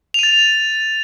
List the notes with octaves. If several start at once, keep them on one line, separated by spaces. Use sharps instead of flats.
A6 D#7 F7